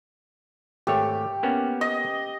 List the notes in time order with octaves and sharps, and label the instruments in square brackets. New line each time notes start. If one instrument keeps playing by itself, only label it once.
[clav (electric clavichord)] G#1 A3 C#5 [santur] G4
[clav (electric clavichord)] A#3 B3 C#4
[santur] D#5